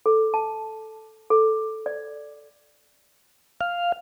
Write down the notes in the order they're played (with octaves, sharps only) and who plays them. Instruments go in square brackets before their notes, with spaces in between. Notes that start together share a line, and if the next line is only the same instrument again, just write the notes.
[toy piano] A4
A5
A4
D5
[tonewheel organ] F5